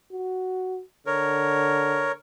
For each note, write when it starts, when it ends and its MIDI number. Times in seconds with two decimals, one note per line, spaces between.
0.11 0.82 66
1.06 2.16 50
1.06 2.12 70
1.06 2.12 73